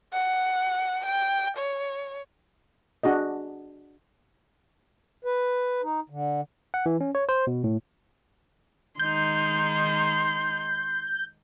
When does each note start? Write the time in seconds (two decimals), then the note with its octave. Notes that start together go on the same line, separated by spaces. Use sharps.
0.13 F#5
1.06 G5
1.57 C#5
3.03 D4 F#4 G#4 D#5
5.25 B4
5.83 D#4
6.10 D3
6.74 F#5
6.86 E3
7.01 C#4
7.15 C#5
7.29 C5
7.47 B2
7.64 A2
8.99 D#3 G#3 D#4 C6 G6